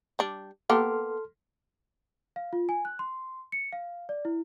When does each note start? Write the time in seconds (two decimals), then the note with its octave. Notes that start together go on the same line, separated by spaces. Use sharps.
0.19 G3 D4
0.70 A#3 B3 G4 A4 C6 F6
2.36 F5
2.53 F4
2.69 G#5
2.85 F#6
2.99 C6
3.52 C#7
3.73 F5
4.09 D5
4.25 E4